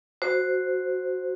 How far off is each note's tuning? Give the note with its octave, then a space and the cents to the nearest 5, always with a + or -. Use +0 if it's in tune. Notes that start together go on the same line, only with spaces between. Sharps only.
F#4 +0 C5 +0